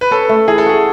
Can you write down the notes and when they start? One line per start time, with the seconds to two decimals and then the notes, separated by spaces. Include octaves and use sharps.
0.01 B4
0.11 C#4 A4
0.29 A3
0.48 E3 G#4
0.58 A4
0.66 F#4 G#4